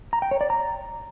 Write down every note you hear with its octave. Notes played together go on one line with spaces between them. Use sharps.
A#5
G5
C#5
D5
A#5